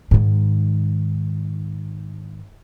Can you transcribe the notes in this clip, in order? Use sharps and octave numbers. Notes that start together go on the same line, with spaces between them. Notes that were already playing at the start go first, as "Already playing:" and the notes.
G#2 D#3